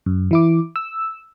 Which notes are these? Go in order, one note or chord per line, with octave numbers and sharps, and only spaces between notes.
F#2
E3 E4 D6
E6